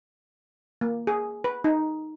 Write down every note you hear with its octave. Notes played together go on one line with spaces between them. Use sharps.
A#3
G#4
B4
D#4